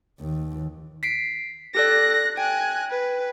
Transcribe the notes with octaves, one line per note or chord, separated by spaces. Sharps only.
D#2
B6 C7 D7
G4 A4 D5 F#6 A#6
G5 G#5 F#6
B4